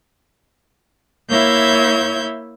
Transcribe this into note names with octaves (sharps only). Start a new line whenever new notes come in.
A#3 E4 C#5 E5 G6 G#6